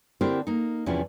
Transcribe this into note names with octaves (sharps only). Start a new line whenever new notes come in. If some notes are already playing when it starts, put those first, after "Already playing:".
D3 C4 E4 G4 A#4 C5
A#3 D#4
E2 C3 F3 C#4 E4